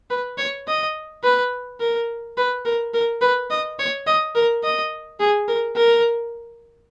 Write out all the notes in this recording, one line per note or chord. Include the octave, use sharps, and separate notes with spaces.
B4
C#5
D#5
B4
A#4
B4
A#4
A#4
B4
D#5
C#5
D#5
A#4
D#5
G#4
A#4
A#4